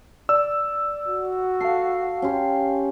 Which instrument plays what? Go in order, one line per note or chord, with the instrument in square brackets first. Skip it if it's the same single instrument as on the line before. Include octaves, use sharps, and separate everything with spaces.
[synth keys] D5 [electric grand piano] E6
[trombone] F#4
[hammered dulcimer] A4 [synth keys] F5 C7
[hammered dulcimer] C#4 G4 C6